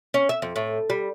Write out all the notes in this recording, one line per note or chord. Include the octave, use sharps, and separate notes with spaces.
C#4
E5
F2
A2
G3